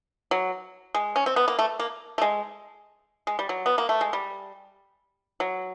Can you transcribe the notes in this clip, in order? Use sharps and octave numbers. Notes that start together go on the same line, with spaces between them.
F#3
G#3
C#4
C4
B3
A#3
A3
A#3
A3
G#3
G#3
G3
F#3
B3
A#3
A3
G#3
G3
F#3